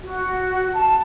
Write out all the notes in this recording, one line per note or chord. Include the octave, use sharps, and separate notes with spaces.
F#4
A5